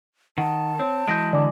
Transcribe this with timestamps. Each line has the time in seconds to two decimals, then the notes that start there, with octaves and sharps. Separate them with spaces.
0.38 D#3 F#5 A5
0.79 C4 C#5
1.07 E3 F#3 G#3 G6 A#6 D7
1.33 D3 D5 G#5 D6